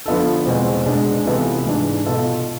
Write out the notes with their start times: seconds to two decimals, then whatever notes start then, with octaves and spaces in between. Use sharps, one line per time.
0.06 D3 F3 B3 F4 A4
0.46 E2 B2 G#3 C4
0.86 B2 G#3 D4 G#4
1.26 C3 E3 B3 F4 A4
1.66 G#2 E3 G#3 D4
2.06 B2 B3 F4 A4